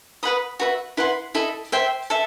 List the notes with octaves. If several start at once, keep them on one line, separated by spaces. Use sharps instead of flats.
B4 F#5 B5 D#6
F#4 B4 E5
E4 B4 F#5 C6
E4 A4 D#5
C5 E5 G5
A4 E5